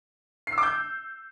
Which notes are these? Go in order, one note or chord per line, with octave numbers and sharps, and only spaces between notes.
C7
E6
D6
G6